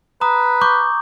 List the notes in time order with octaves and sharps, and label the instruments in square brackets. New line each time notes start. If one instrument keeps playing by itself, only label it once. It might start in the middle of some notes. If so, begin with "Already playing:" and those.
[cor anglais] B4 [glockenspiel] A#5 D#6
[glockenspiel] C#6 D6 G6